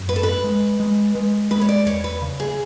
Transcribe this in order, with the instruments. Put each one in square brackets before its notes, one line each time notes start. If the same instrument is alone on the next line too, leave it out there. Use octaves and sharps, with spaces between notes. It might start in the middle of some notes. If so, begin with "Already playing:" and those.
Already playing: [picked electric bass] F#2
[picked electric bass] G#2 [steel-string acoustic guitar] B4
[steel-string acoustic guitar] A4
B4
[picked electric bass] G#3
G#3
G#3
[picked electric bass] G#3 [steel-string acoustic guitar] B4
[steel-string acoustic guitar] C#5
D5
[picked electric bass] E2 [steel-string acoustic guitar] C#5
[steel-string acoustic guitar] B4
[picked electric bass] C#3
[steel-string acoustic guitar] G#4